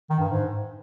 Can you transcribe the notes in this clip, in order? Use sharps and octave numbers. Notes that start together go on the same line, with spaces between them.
D#3
G2
G#2